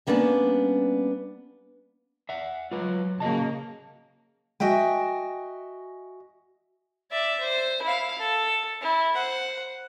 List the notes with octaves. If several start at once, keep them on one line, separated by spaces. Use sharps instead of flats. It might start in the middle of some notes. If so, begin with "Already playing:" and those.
G3 A#3 B3 C#4 D4
E5 F#5
F#3 F4 B4
C#3 F#3 A#3 F#4 D#5 A5
F#4 D#5 E5 G5 G#5
D5 E5
C5
E4 F5
A4
E4
C5 F#5